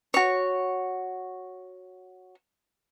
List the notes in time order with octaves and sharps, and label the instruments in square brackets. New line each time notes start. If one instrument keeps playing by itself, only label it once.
[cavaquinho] F#4 C#5